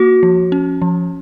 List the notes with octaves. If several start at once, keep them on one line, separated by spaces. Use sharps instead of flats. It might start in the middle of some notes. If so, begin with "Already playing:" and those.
Already playing: A#3 F#4
F3
C#4
F3